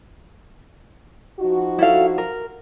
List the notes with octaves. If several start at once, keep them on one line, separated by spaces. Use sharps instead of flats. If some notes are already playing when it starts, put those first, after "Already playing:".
F3 D#4 F#4
E4 A4 F5
A#4